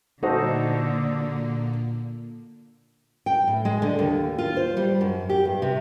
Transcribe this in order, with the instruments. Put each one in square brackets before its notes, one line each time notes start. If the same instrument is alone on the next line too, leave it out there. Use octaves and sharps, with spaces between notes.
[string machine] A#2 A#3 [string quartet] D3 [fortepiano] D#4 F#4 C5 [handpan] A4
[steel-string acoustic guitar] G5
A2
G#3
D3
D#2
F4
C5
G3
F#2
G4
G2
C3